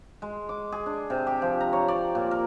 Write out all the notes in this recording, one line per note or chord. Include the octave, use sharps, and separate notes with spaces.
G#3
D6
G#4
D4
C3
G4
F3
A#5
C#5
D5
A#2
A#4